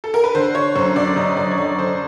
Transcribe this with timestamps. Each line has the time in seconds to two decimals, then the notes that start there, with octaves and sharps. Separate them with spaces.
0.04 A4
0.14 A#4
0.24 B4
0.35 D3 C5
0.55 D3 C#5
0.75 F#2 C5
0.96 F#2 D5
1.16 F#2 D#5
1.37 F#2 D5
1.51 C#5
1.57 D3 D5
1.78 D3 C5